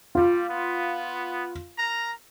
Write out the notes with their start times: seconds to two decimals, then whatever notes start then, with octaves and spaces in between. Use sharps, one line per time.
0.15 G3 F4
0.49 B3
1.77 A#4 A#5